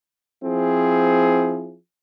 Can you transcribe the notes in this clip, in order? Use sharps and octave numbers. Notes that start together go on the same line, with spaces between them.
F3 C4 E4 G#4